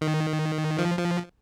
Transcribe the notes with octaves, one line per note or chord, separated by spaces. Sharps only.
D#3
F3
F3